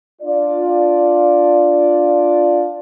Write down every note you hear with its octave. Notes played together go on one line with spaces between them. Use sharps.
D4 F4 D5